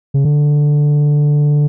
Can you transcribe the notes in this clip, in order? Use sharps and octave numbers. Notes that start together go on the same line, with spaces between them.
C#3
D3